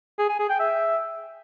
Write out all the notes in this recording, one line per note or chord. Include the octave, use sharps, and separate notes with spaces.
G#4
G#5
G#4
G5
E5